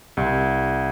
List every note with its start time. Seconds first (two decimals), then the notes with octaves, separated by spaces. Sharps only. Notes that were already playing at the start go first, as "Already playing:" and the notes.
0.17 C2